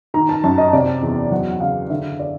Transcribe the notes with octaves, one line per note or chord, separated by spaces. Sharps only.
D#3 A#5
A5
F#2 A5
D#5
C3 D5
E2
F#3 F#5
F#5
C#3 F5
D3 E5
D5